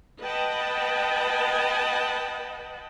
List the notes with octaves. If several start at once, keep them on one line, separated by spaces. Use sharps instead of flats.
B4 D#5 F#5 G5 A5 B5